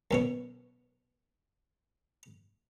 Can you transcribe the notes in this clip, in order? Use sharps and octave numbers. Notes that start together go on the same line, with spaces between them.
F#2 B2 C#5